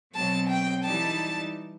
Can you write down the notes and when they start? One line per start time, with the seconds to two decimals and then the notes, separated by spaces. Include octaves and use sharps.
0.15 B2 F#3 C4 A5
0.50 G5
0.84 E3 G3 D#4 A5